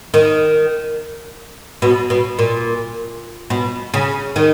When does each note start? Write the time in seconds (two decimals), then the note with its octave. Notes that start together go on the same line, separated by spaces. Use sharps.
0.14 D#3
1.82 B2
2.10 B2
2.39 A#2
3.50 B2
3.94 C#3
4.36 D#3